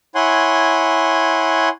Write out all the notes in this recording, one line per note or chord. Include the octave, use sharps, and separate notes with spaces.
E4 C#5 F#5 G#5 C6